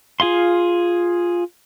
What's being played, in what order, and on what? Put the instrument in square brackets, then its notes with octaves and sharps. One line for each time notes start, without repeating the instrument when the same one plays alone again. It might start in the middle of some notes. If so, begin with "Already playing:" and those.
[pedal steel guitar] F4 G#4 F5 C6